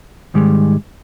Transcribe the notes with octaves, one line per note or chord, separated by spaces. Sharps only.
G#2 D#3 G3 G#3